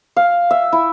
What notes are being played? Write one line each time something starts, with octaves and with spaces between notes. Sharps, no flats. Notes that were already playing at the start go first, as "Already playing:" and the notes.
F5
E5
E4